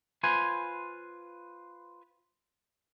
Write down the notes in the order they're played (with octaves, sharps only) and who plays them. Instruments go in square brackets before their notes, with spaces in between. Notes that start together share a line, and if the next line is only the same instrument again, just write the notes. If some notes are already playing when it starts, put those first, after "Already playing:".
[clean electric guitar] F4 B4 C5 G#5